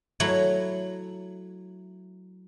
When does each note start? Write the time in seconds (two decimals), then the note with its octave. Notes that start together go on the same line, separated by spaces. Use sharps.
0.20 F#3 A3 E4